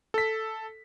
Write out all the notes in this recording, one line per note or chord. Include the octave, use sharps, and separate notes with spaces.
A4 B6